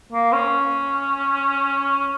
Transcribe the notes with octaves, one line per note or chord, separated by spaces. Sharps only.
A#3
C#4